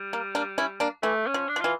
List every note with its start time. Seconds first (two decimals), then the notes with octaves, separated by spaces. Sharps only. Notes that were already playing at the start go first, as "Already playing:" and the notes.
Already playing: G3
0.13 A#3
0.35 A#3 D4
0.58 C#4 E4
0.80 A#3 D4
1.03 E3 A3
1.27 C#4
1.34 F3
1.49 D4
1.56 F3
1.60 E3 F4